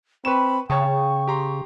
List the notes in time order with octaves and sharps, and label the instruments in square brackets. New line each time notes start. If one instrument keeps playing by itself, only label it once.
[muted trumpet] C4 [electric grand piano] B4 C#6 E7 [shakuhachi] B5
[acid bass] C#3 [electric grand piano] C#5 A5 D#6 [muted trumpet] G5 [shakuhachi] C#6
[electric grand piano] G4 A#5 C6